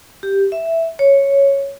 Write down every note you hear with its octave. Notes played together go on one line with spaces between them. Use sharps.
G4
E5
C#5